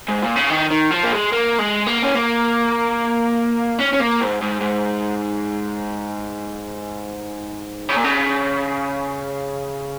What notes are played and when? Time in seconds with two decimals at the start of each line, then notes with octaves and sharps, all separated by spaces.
0.09 G#2
0.23 A#2
0.36 C#3
0.51 D#3
0.70 D#3
0.91 F3
1.03 A#3
1.12 G#3
1.32 A#3
1.59 G#3
1.87 A#3
2.03 C#4
2.15 A#3
3.79 C#4
3.93 C#4
4.00 A#3
4.20 G#2
4.41 G#2
4.60 G#2
7.89 C#3
7.97 A#2
8.04 C#3